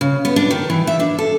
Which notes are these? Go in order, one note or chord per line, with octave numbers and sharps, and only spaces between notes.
C#3
B3
D4
D#3
E3
E5
D4
A4